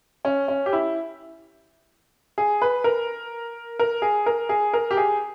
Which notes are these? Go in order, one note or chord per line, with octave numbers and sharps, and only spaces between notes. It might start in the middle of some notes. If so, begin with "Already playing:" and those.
C#4
C#4
G4
E4
G#4
B4
A#4
A#4
G#4
A#4
G#4
A#4
G4
G#4